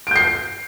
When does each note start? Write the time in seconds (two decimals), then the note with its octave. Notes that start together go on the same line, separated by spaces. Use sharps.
0.07 D7
0.11 G6
0.16 C7